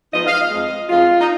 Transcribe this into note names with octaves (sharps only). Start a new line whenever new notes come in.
G#2 F3 B3 D#4 D#5
F5
D#5
F2 F3 G#3
F2 F3 G#3 F4
D#4